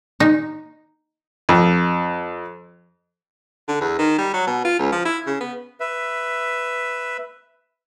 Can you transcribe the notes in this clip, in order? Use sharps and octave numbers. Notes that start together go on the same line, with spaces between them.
D#4
F2
D3
E2
D#3
G3
F#3
B2
F4
C#2
F3
E4
C#3
B3
B4 E5